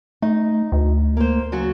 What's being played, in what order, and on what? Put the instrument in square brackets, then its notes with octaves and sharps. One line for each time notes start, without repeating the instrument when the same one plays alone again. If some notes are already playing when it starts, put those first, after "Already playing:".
[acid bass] A3 [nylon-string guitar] D#4
[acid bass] D2
[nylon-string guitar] A#3 C5
C#3 F#3 F#4